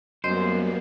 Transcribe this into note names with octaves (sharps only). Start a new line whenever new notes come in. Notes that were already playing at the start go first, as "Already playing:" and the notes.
F#2 G3 A#3 B3 C5 D#5